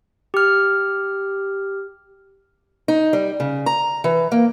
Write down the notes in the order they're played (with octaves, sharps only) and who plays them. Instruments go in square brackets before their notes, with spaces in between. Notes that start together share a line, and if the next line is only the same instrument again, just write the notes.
[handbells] G4 F6
[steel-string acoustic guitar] D#4
G3
C#3
A#5
E3
A#3